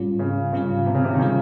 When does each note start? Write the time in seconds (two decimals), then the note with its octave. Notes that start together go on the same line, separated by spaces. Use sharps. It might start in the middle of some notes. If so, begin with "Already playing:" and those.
Already playing: G#2 G3 C#4 F4
0.19 C#3
0.52 G#2 C#3 G3 C#4 F4
0.86 C3
0.94 C#3
1.04 C3
1.13 D#3
1.19 C#3 G3 C#4 F4